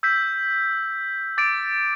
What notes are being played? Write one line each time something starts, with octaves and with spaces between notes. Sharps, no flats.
E6 G6 B6
D6 A6 D7